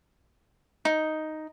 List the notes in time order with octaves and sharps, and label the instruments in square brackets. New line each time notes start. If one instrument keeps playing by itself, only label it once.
[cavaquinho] D#4